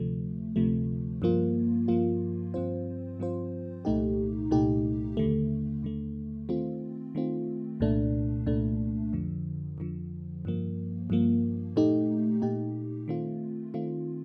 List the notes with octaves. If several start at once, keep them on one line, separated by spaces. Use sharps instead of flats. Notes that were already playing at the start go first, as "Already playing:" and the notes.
Already playing: D2 C3 F3 A3
D2 C3 F3 A3
G2 F3 A#3 F4
G2 F3 A#3 F4
G2 F3 C4 F4 C5
G2 F3 C4 F4 C5
C2 A#2 A3 D#4 G4
C2 A#2 A3 D#4 G4
D#2 D3 A3
D#2 D3 A3
D#3 A3 C4 F4
D#3 A3 C4 F4
C2 A#2 A3 D4
C2 A#2 A3 D4
F2 D3 F3
F2 D3 F3
G2 F3 A#3
G2 F3 A#3
A#2 A3 D#4 G4
A#2 A3 D#4 G4
D#3 A3 C4 F4
D#3 A3 C4 F4